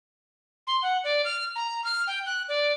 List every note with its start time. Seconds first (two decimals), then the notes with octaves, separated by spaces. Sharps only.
0.67 C6
0.82 F#5
1.04 D5
1.25 F6
1.56 A#5
1.84 F6
2.07 G5
2.26 F#6
2.49 D5